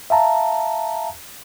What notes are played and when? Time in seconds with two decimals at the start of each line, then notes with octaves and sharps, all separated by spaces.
0.10 E5 F5 A5 A#5